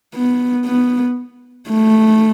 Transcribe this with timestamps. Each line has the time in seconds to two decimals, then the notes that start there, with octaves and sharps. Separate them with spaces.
0.15 B3
0.66 B3
1.69 A3